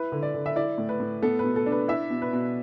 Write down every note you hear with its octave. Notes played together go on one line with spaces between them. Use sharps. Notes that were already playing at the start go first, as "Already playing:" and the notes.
Already playing: E4 B4
D3
D5
D3
E5
E4 D5
A2
B4
A2
B3 A4
B2 B4
A4
D4
B4
E4 E5
B2
B4
B2